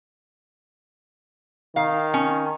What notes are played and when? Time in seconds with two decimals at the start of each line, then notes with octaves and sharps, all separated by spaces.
1.76 D#3 F5
2.14 C#4